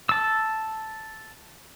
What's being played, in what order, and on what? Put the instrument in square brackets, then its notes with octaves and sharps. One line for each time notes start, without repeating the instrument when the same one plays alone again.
[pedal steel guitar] A5 E6